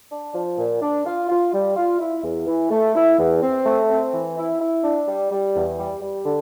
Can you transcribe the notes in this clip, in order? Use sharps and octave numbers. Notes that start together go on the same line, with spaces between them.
D4
F3
A#2
D4
F4
F4
G3
F4
E4
E2
E3
A3
E4
E2
C4
A3
C4
E3
E4
E4
D4
G3
G3
E2
G3
G3
D3